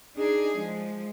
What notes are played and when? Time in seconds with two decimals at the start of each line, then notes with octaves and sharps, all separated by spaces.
0.17 D4 D#4 G#4
0.58 F3 G#3